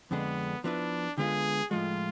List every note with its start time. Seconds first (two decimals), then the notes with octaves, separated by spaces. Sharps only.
0.11 F2 D3 G#3 B3 D4
0.64 F3 B3 D4 E4 B4
1.18 D3 G#3 B3 F4 G#4
1.71 A2 F3 G#3 F4